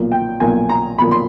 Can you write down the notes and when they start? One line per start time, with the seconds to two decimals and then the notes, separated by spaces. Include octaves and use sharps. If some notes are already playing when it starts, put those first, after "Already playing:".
Already playing: B1 A#2 F3 A#3
0.12 G5
0.40 B1 A#2 F3 A#3 G#5
0.69 A#5
0.98 B1 A#2 F3 A#3 B5
1.11 C6